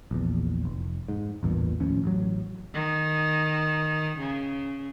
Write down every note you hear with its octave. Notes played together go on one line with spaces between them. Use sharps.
A#1 E2
F1
G#2
A1 E2 G2 A#2
D#2 A2 F3 C#4
A1 F#3
D#3
C#3